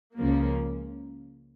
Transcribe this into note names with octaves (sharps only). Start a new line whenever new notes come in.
C#2 C#3 F3 A#3